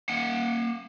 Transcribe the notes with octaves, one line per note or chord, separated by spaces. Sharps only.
A#3 F#5